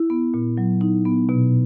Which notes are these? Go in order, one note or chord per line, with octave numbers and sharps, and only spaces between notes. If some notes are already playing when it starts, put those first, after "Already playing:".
Already playing: E4
B3
A#2
F#3
D#4
B3
B2